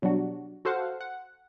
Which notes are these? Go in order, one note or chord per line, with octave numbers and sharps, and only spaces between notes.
B2 F#3 G3 D4 F#4
F#4 A4 C5 F5 F#5
F#5